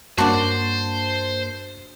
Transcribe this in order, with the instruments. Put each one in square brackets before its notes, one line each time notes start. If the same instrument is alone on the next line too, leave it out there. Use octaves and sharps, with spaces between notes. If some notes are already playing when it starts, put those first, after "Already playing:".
[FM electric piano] G2 A#3 [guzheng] D4 F#4 [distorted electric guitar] C5 [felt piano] A5